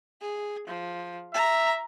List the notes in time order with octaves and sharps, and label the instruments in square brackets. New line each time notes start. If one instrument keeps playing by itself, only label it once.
[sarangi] G#4
F3
[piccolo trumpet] E5 [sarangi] A#5